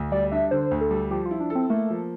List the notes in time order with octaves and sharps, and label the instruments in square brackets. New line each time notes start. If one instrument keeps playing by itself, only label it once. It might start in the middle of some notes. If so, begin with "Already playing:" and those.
Already playing: [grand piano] D2
[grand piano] G3 [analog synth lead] D5
[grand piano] D4 [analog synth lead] E5
[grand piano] D3 [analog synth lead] C5
[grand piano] D2
[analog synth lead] A4
[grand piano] G3
[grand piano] F3 [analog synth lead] G4
[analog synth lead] F4
[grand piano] E4
[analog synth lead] D4
[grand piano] A4
[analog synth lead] C4
[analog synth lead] A3 [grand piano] A#3
[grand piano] F3